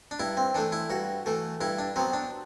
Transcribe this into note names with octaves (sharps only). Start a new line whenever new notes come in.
D4
G2 E4
C4
E3 A3 D4
E4
G2 F#4
E3 A3
G2 E4
D4
F#3 B3 C4
D4